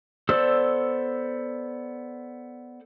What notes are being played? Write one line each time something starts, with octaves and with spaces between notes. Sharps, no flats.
B3 A4 C5 D5 E6